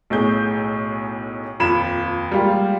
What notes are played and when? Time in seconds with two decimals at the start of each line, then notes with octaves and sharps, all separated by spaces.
0.10 B1 A2 G#4 G6
1.60 D#1 F2 F4 B5 G#6 E7
2.32 G3 G#3 A#3 F4 G4